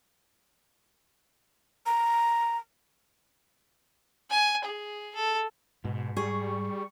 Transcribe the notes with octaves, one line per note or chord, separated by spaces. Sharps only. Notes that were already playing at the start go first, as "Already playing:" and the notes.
A#5
G#5
G#4
A4
G#2 B2
G3 G#4 C#6